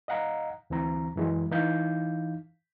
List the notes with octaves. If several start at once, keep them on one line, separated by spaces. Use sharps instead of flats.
D#5 F5 F#5 A#5
D2 E3 C4 A#5
F#2 E3 G#3
E3 D#4 F5 G6